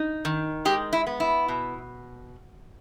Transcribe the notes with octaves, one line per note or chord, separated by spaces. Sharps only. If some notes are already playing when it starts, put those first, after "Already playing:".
Already playing: D#4
D#3
G#3 G4
E4
B3
E4
B2